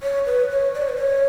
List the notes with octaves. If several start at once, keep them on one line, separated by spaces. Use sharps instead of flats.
C#5
B4
C#5
D5
C#5
B4
C#5